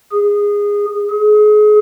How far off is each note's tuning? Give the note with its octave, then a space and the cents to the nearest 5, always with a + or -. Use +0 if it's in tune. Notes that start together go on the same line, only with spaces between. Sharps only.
G#4 -20
G#4 +30